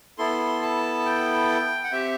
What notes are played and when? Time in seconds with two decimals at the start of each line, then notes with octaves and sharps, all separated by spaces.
0.18 B3 E4 A4 C6
0.62 A5
1.06 G5
1.84 F#5
1.92 C4 G4 E5